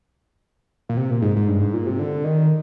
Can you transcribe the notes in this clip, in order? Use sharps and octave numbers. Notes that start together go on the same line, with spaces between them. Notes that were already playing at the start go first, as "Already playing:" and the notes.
A#2
C3
A#2
G#2
G#2
G2
G#2
A#2
C3
D3
D#3